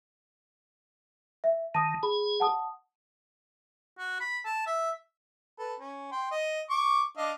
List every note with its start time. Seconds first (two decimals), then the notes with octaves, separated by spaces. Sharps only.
1.44 E5
1.75 D#3 A5 D#6
2.03 G#4 B5
2.40 F#5 A5 D#6
3.99 F#4
4.20 B5
4.45 A5
4.67 E5
5.59 A4 B4
5.80 C#4
6.12 G5 C6
6.31 D#5
6.70 C#6 D6
7.17 D4 D#5 F5